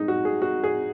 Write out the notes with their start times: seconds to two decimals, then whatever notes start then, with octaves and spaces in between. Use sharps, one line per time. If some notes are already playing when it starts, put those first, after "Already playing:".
Already playing: G#3 D#4
0.08 F#4
0.25 G#4
0.42 F#4
0.64 G#4